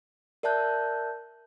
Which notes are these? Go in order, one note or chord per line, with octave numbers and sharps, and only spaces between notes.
A#4 D5 E5 A5 F#6 G6